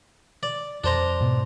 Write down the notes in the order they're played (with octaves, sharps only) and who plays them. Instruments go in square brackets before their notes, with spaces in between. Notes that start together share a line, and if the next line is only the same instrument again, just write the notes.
[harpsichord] D5
[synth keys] F2 [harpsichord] D4 C5 A#5
[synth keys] G#2 B2